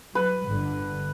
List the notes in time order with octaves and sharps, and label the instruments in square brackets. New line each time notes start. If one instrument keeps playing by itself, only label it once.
[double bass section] F#3 [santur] B4
[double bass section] G1 D3